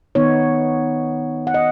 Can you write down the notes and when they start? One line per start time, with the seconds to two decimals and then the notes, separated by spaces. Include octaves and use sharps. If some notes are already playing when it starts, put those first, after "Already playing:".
0.15 D#3 B3 D#4 C#5
1.47 F#5
1.54 D#5